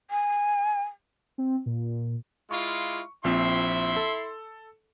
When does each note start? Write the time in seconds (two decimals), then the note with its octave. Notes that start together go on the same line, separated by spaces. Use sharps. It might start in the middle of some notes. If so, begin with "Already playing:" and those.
0.11 G#5
1.38 C4
1.66 A#2
2.51 G#3 E4 F4 C#6
3.24 A#1 F3 C4 E4 E5 C6
3.96 A4